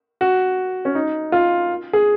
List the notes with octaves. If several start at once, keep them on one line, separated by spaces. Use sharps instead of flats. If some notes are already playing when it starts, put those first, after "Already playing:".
F#4
C#4
D#4
F4
G#4